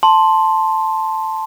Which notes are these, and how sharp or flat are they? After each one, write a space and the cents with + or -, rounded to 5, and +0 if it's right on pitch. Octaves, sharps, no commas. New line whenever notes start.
A5 +0 C6 +5